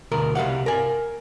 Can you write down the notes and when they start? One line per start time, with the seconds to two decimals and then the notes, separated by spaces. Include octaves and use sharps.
0.12 D2 B2 A#4
0.35 C2 G3 F5 F#5
0.66 A#4 G#5